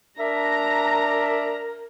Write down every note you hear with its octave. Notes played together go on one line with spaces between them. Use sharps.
D4 A#4 E5 A#5